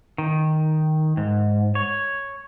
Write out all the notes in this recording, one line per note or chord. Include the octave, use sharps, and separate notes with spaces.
D#3
G#2
C#5